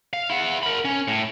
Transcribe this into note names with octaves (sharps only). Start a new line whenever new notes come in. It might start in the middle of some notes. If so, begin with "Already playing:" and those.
F5
E4 F#5
A#4 B5
C#4
A2